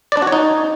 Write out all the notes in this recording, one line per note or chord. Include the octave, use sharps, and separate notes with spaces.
D5
D4
F#4
C#5
D#4